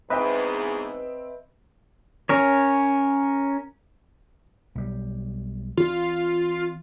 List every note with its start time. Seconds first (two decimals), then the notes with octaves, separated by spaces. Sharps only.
0.10 E2 G#2 C4 B4 D#5 E5 G5
2.29 C#4 A#4 C#5
4.75 B1 G3
5.77 E3 C4 F4